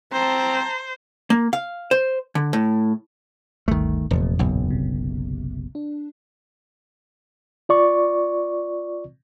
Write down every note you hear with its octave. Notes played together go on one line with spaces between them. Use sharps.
C4 C5 A5 A#5
A#3
F5
C5
D3
A2
G1 D2 G2 D#3 A3
F1 E2 A#2
F#1 B1
C3
D4
F4 D5 C#6